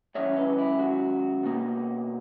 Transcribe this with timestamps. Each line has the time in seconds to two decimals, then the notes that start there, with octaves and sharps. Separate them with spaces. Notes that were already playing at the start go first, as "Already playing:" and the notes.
0.15 G#2 D#3 F#3 C#4 E4 C#5 E5
0.37 B4 D#5
0.59 E4
0.79 F#4
1.43 B2 A#3 D#4